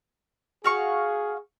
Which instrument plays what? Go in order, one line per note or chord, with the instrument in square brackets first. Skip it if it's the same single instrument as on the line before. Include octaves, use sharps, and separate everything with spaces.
[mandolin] F#4 F5 C#6 [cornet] G#4